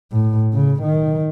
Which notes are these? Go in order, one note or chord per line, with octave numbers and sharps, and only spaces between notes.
A2
C#3
D#3